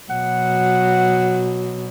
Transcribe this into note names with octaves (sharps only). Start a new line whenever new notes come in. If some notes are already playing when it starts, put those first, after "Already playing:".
B2 F#3 F#5